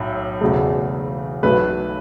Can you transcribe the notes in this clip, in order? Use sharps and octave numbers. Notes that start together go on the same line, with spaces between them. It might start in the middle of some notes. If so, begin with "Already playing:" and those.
Already playing: B1 A2
E1 E2 C#3 F#3 A3
B1 B2 A3 B4